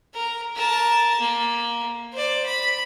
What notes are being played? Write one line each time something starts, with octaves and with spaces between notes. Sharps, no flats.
A#4
A#4 A5
A#3
C5 D5
B5